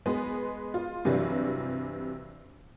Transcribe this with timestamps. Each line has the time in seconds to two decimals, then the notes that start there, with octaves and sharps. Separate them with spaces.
0.06 G#3 B3
0.74 F4
1.05 G2 C3 E3 F#3 G3